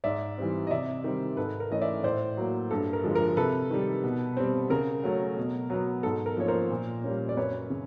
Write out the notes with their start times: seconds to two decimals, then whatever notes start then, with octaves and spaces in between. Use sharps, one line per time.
0.04 G#2 D5 E5
0.38 E3 G3 C4
0.67 D#5
0.71 C3 D5 E5
1.04 D#3 G3 C4
1.37 G#2 A4 B4
1.60 A#4
1.71 E3 A3 C#4 D#5
1.81 D5 E5
2.03 A2 C5 D5
2.37 F#3 A#3
2.71 G2 A4
2.93 A#4
3.04 D3 F3 G#3
3.15 A#4
3.37 C3 A4 B4
3.71 D#3 G3
4.04 B2
4.37 G3 C4
4.70 C#3 A#4
5.04 F#3 A3 C#4
5.37 B2
5.70 F#3 B3
6.03 G#2 A4
6.26 A#4
6.37 F3 A#3 C#4 C#5
6.48 A#4 C5
6.70 A#2
7.04 G3 A#3 C#4
7.29 D5
7.37 F#2 B4 C#5
7.70 C#3